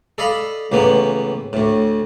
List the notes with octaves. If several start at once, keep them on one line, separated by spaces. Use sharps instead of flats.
A4 D5 D#5 F5 B5
C#2 A2 E3 A#3 B3
D2 A2